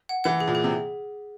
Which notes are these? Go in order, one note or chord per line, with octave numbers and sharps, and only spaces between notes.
F#5
E3 F#5
G#4
A#2
G#4
C3